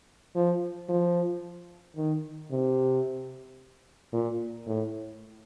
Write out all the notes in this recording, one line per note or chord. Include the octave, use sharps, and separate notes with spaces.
F3
F3
D#3
C3
A#2
A2